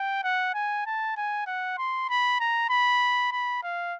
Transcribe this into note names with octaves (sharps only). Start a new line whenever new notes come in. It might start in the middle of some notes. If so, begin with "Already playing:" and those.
Already playing: G5
F#5
G#5
A5
G#5
F#5
C6
B5
A#5
B5
B5
F5